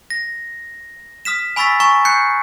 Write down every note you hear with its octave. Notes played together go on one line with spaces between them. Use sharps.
A#6
D#6 F6 B6 E7
G#5 B5 C#6 E6 A6 B6
G#5 A#5 C#6
F#6 G6 C7 C#7